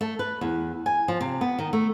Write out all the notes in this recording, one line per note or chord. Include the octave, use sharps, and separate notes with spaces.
A3
B4
E2
G#5
F3
C3
B3
D#3
A3